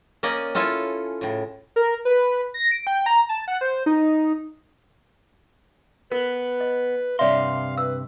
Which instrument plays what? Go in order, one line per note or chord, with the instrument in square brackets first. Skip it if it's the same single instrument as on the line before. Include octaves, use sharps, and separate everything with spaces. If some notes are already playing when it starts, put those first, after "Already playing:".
[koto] A#3 C#4 D5 D#5
C#4 E4 F4 A4 G#5
A2 C#3
[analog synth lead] A#4
B4
A#6
D7
G5
A#5
A5
F#5
C5
D#4
[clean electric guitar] B3 [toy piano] A#4 [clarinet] B4
[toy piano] D#5
[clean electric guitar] G2 C3 C6 [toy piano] C#5 D5 E5 [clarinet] F5
[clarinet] B4 [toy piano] E6